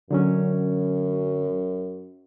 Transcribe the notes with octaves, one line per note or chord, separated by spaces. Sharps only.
F#2 D3 F#3 C#4